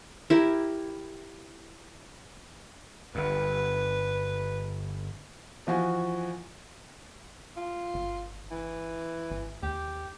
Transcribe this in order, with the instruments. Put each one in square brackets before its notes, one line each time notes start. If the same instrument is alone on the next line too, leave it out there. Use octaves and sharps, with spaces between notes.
[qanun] E4 G4 A#4
[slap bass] G1 G2 [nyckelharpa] B4
[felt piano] E3 F3 F#4 G#5
[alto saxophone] F4
[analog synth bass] G1
[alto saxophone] E3
[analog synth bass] G#1
[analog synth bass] D#2 [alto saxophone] G4